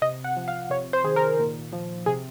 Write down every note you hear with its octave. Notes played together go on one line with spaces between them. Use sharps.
C3 D#5
F#5
F3
F5
C3 C#5
C5
D#3 G#4
A#4
A#2
F3
C3 G#4